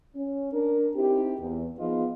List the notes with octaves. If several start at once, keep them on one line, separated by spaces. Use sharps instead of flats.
C#4
D4 A#4
C4 D#4 E4 G4
E2
F3 B3 D#4 F4 G#4 D#5